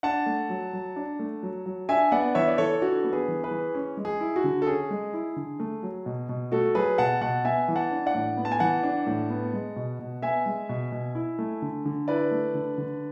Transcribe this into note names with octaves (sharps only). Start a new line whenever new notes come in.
D4 F#5 A5
A3
F#3
F#3
D4
A3
F#3
F#3
D4 E5 G#5
B3 D5 F#5
E3 C#5 E5
D5
E3 A4 C#5
D4 F#4 A4
B3
G#4 B4
E3
G#4 B4
E3
C#4
G#3
G#4
E4
F#4
D3
A4
C#4 G#4
G#3
E4
D3
A3
F#3
B2
B2
A3 F#4 A4
F#3 G#4 B4
B2 F#5 A5
B2 F#5 A5
B3 E5 G#5
E3
F#5 A5
D4
D5 F#5
A2
B3
A5
G#5
E3 F#5 A5
D4
A2
B3
G#3
B2
B2
B3 E5 G#5
G#3
B2
B2
E4
A3
D3
D3
E4 B4 D5
A3
D3
D3